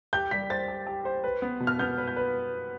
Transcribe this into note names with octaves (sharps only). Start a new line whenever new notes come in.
G4 G6
G3 B6
C5 A6
G4
G4
C5
B4
B3
B2
F6
B3 G6
B4
G6
B4